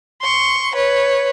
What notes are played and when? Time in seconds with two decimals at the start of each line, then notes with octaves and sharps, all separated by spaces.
0.22 C6 C#6
0.75 B4 C#5